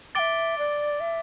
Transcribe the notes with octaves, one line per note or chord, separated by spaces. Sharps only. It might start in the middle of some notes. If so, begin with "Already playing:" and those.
E5 G5 D6 A6 D7 G7
D5
E5